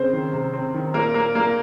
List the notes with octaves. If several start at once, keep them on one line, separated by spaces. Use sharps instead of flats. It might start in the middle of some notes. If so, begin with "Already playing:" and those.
Already playing: C#3 C4 C5
D#3
C3
C4
D#3
A#2 A#3 A#4
A#2 A#3 A#4
A#2 A#3 A#4